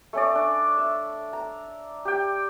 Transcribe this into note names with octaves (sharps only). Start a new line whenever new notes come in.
A3 C#4 D5
D4
E5
A#5
G4 G5